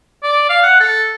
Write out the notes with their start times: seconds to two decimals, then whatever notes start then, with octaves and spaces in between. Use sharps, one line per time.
0.23 D5
0.50 F5
0.63 F#5
0.80 A4